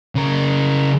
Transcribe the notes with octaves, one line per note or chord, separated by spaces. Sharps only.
C#3 A#4